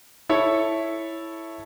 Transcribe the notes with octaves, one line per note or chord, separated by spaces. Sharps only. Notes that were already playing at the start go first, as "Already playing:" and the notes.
E4 A4 C#5